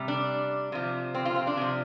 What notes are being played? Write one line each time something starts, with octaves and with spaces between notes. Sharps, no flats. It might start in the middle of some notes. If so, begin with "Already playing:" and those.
Already playing: C3 G3
D4
C3 F3
C4
F4
C4
D4
C3 F3